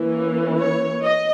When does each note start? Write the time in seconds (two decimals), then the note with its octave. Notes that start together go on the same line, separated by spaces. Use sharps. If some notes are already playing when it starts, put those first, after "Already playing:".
Already playing: E3 A#3 C#4
0.60 C#5
1.02 D#5